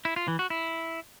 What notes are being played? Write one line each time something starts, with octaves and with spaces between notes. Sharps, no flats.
E4
F4
E3
F#4
E4